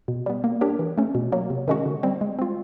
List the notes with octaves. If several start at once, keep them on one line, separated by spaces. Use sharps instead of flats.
B2
G3 B3
A#3
D4 G4 A#4 C#5
E3
A3 C#4
B2
F#3 A#3
C3
D#3 G#3 C#4 F#4
D3
G3 C4
G#3
C4 F4